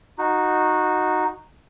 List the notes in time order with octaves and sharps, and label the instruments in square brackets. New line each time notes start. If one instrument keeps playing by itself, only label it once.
[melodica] D#4 F#4